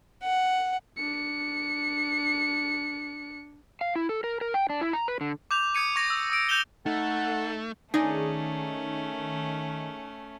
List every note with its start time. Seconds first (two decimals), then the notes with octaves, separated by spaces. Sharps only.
0.23 F#5
0.97 D4 C#7
3.81 F5
3.96 E4
4.09 A4
4.24 A#4
4.41 A#4
4.54 G5
4.70 D4
4.81 E4
4.93 A#5
5.08 B4
5.21 D3
5.51 D6 G6 F7
5.75 D#6 G#6 C#7 D#7
5.96 C#6 G#6 A#6
6.10 E6
6.30 D#6 E6 D7
6.49 G6 A#6 E7 F7 G7
6.86 A3 D#4 A4 F#5
7.94 D#3 A3 C#4 D#4 G#4 D5